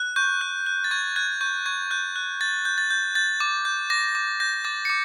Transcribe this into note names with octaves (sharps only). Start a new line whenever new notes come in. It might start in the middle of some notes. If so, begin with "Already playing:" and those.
Already playing: F#6
C#6 G6
F#6
F#6
A6
C#6 G#6
F#6 G#6
C#6 G6
C#6 G#6
F#6 G6
F#6
G6 A6
G6
A6
G6
G6 A6
D6
G6
D6 A#6
D6
G6 A#6
D6 A6
C#7
D6